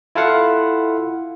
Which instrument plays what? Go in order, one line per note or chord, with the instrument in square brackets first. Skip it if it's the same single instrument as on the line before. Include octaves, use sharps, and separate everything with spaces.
[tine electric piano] E4 F4 A4 F5 F#5